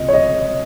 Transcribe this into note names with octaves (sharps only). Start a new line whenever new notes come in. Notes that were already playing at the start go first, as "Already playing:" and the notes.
Already playing: C#2 C3 F3 D#5
C#5
D#5